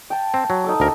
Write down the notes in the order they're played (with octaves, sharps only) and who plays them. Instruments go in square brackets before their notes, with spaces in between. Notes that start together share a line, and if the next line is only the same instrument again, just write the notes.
[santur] G5 A5
[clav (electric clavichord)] C4
F#3
[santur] D#4 A4 D6
[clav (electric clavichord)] D2 A#4